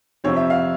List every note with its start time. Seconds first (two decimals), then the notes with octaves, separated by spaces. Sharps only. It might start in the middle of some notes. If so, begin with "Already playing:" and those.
0.24 F2 C3 F3 C4 C#5
0.36 E5
0.50 F5